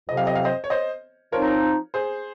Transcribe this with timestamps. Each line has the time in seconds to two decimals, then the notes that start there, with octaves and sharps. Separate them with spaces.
0.09 F2 C3 F#3 C4 D#5
0.17 F5
0.27 D#5
0.35 F5
0.45 C5 D#5
0.64 C#5
0.70 C5 D#5
1.32 F3 C4 D#4 A#4 C#5
1.94 G#4 C5